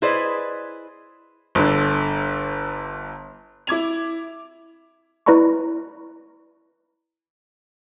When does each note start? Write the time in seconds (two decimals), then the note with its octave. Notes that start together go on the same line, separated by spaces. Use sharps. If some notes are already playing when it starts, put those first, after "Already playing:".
0.02 E4 G#4 B4 C5 D5 D#5
1.55 G1 D3
3.67 E4 D6 G#6 F7
5.26 E4 B4 D5 A#5 B5 C#6